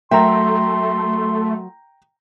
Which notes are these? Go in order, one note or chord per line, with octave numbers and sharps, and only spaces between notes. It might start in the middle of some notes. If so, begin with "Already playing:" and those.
F#3 A3 A#4 E5 G5 A#5 C6